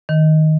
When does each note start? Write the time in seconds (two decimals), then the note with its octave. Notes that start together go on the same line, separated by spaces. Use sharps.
0.09 D#3